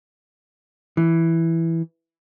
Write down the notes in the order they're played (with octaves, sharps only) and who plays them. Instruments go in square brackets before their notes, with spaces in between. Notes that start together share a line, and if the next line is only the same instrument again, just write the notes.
[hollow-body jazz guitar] E3